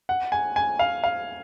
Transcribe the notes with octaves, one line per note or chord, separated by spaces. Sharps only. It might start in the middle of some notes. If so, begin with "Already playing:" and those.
F#5
G#5
G#5
F5
F5